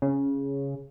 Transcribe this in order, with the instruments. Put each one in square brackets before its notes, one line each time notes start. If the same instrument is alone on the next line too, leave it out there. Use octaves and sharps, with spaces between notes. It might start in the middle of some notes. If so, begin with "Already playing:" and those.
[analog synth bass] C#3